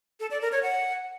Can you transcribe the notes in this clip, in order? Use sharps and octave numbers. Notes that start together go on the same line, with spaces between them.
A4
D5
A#4
C#5
F#5